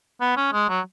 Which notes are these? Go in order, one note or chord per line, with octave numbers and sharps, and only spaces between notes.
B3
C#4
G#3
F#3